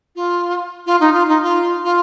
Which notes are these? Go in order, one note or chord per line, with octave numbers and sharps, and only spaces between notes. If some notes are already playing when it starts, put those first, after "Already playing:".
F4
F4
D#4
F4
D#4
F4
F4